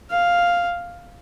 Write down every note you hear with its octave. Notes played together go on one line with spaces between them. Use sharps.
F5